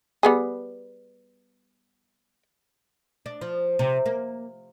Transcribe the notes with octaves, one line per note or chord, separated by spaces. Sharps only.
G3 B3 G#4
D4
F3
C3
A#3